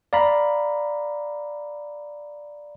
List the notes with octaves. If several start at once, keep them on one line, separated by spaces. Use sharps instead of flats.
D5 F5 A#5 B5